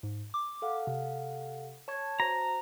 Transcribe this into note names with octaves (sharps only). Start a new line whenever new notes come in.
G#2
D6
A4 F5 F#5
C3
C#5 A5 C#6 G#6
F#4 C5 A#5